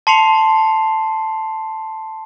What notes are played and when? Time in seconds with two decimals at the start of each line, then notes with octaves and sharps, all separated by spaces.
0.07 A5 C6 C7 C#7 F7